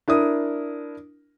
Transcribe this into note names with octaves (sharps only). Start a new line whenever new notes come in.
D4 E4 A#4 D#6